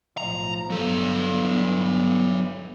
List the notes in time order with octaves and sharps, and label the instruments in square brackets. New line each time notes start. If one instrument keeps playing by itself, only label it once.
[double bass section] B1 A2 F3 [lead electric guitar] A#5
[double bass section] G1 B3 [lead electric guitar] F#3 A4